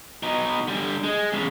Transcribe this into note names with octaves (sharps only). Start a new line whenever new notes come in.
B2 D#4
D3 G3
G#3
E2 C#3